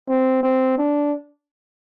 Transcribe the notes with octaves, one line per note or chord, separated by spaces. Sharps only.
C4
C4
D4